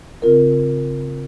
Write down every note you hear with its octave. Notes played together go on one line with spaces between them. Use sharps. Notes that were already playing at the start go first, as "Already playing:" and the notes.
C#3 C4 F4 A#4